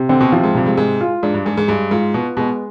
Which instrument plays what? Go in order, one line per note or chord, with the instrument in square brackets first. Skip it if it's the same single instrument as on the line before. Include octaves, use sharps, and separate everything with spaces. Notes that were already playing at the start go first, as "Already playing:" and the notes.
Already playing: [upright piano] C3
[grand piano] D3 [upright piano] C4
[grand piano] B2
[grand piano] C3 [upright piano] F3
[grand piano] G#2
[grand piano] G2 [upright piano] C3
[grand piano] G#2
[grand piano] G#2 [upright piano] G#3
[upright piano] F4
[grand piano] G#2 [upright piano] D4
[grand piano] G2
[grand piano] G#2 [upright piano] G#4
[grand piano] G#2
[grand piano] G2 [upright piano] G#3
[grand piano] G#2 [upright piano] F4
[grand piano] B2 [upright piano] B3
[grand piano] B2 [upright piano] G#3